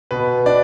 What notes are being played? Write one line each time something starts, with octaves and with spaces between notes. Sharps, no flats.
B2 B4
D4 D5